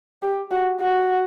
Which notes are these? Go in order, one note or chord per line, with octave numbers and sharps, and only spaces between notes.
G4
F#4
F#4